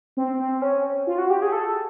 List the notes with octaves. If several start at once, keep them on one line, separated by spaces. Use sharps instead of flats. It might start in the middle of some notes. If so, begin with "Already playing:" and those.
C4
C4
C#4
F4
F#4
G4
G#4
A4